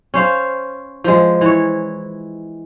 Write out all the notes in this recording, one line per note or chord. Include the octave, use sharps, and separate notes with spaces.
C#4 C5 F5
F3 G#3
E3 C#5